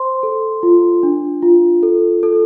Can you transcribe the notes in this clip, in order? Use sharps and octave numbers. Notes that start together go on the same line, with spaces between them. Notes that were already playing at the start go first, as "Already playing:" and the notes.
Already playing: C5 C6
A4
F4
D4
F4
A4
A4